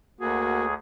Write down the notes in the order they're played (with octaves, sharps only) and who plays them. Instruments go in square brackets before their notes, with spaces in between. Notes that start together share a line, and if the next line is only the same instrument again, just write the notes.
[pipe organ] D2 G#4 [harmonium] A#3 F#4